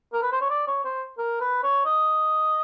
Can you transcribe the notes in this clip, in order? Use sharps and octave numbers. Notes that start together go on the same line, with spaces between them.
A#4
B4
C5
C#5
D5
C#5
C5
A#4
B4
C#5
D#5